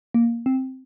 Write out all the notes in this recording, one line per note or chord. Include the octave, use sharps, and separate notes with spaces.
A#3
C4